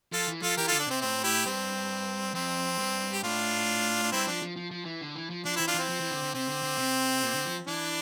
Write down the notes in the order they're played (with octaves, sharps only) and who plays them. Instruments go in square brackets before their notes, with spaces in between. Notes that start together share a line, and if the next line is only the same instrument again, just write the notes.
[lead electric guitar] F3 [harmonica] F4 A4
[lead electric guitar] E3
[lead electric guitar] F3 [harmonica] F4 A4
[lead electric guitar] E3 [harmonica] G4 A#4
[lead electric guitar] D3 [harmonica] F4 A4
[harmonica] D4
[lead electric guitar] C3 [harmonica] C4
[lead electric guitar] A2 [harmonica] C4
[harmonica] E4 G4
[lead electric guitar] G2 [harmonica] C4
[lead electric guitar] F2 [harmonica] C4
[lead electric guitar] G2
[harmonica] G4
[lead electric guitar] A2 [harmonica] D4 F4
[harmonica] D4
[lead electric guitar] G2 [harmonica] C4 E4
[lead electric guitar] F3 [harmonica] D4
[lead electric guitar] F3
F3
F3
E3
D3
E3
F3
[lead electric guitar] F3 [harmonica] D4
[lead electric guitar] E3 [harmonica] C4 E4
[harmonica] D4 F4
[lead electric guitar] E3 [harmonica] C4
[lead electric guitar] F3
E3
D3
D3
[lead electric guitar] C3 [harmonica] C4
[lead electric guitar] D3
D3
C3
A#2
D3
F3
[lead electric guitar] E3 [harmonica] D4